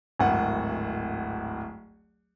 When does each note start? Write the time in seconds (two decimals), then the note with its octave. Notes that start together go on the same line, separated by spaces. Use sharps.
0.20 D1 G#1 F#5